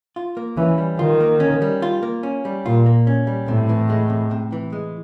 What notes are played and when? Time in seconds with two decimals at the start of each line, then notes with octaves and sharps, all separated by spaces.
0.16 F4
0.37 A#3
0.57 E3 C#4
0.78 G3
0.99 D#3 F4
1.20 A#3
1.40 C#4
1.62 G3
1.82 F4
2.03 A#3
2.23 C#4
2.45 G3
2.65 A#2 F4
2.86 A#3
3.07 C#4
3.27 G3
3.48 A2 C3
3.69 E3
3.90 G#3
4.10 C3
4.31 C3
4.52 E3
4.73 G#3